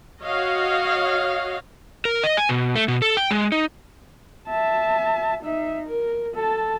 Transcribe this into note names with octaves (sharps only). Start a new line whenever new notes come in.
F#4 C#5 D#5 F5
A#4
D#5
G#5
B2
A3
B2
A4
G5
G#3
D#4
E5 A5
D#4 E5
A#4
A4 A5